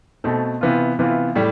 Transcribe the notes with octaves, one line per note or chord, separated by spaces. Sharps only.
B2 A3 C4
C3 E3 B3 F4
C3 E3 B3 F4
A2 G3